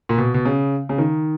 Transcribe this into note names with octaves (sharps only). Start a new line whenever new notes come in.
A#2
B2
B2
C#3
C#3
D#3